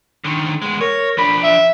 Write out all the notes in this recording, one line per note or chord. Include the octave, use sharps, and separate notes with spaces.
D3 D#3
G#3 B3
A#4 C#5
F3 D4 B5
E5